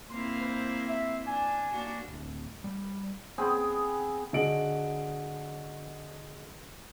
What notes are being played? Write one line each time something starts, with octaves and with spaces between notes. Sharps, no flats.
A#3 C4 E4 C6
C5
E5
D4 G#5
A#3 D4 F#4
D1
G3
B3 C4 G#4 G5
D3 F#4 G#4 D#5 D7 F#7